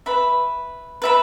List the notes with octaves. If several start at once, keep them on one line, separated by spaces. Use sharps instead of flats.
B4 E5 B5
B4 E5 B5